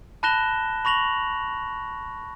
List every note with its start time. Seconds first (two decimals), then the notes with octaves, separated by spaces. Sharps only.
0.23 A5 B5 F#6 A#6 E7 G7
0.85 B5 C#6 A#6 F7 F#7